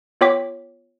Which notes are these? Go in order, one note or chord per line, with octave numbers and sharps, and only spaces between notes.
B3 F4 C#5 G5 D6 B6